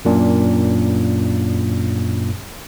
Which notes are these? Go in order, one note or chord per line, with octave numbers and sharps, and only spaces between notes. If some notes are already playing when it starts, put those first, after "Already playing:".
F#2 A#2 D4